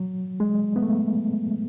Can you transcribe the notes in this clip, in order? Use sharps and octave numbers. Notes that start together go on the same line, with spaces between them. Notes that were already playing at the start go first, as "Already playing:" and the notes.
Already playing: F#3
G#3
B3
A3